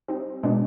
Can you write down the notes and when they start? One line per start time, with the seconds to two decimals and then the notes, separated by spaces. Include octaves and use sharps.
0.08 G3 C4 D#4
0.43 B2 G#3 B3 D4